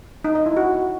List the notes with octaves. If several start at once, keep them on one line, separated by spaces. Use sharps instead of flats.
D#4
D#5
E4
F#4